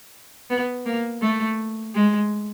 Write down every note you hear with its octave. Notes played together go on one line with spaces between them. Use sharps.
B3
A#3
A3
G#3